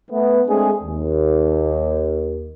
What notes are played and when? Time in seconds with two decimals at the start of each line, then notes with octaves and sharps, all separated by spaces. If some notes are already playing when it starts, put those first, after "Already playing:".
0.11 A3 B3
0.48 G#3 A3 C4 D4 G#4
0.83 D#2